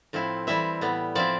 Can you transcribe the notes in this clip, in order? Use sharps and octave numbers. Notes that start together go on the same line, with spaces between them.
A2 F3 C4 E4
E3 G3 C4 E4 E5
A2 G3 B3
F3 C4 E4 D5